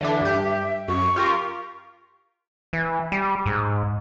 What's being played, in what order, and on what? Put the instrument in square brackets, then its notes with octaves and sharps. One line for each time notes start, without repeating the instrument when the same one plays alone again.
[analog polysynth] D3 E3 D4 [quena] E5
[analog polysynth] G2 G4
[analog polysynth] F#2 [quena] C#6
[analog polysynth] F4 G4 A#4
[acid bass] E3
G3
G#2